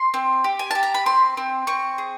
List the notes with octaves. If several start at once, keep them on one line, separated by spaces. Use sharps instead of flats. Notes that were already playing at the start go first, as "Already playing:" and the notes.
Already playing: C6
C4
G4
G#5
G4 A5
A#5
B5
C4 C6
C4
C4 C#6
G#4